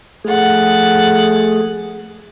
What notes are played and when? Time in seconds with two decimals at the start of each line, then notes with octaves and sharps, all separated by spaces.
0.24 F3 A3 G#4 F#5 A6